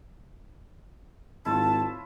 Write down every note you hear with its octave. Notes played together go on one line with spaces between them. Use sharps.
G#1 E4 F4 C#5 A5